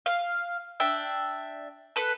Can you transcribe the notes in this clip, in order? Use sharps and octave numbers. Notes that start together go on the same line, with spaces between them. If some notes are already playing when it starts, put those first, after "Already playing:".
F5
D4 E5 G5
A4 B4